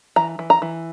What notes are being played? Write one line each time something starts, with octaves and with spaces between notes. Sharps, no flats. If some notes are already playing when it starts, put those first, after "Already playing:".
E3 A#5
E3
A#5
E3